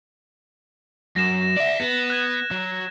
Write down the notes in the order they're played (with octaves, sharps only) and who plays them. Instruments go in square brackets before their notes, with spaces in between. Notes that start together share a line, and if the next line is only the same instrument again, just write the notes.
[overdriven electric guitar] F#2 [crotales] A#6 E7
[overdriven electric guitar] D5 E5
B3
[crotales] F#6 G#6 E7
[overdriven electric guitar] F#3